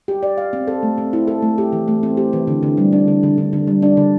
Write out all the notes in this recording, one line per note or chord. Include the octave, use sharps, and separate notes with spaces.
G4
D5
F5
C4
A4
A3
C4
E4
A4
A3
G4
E3
A3
C4
G4
E3
D3
D3
G3
D4
D3
D3
D3
D3
G3
D4
D3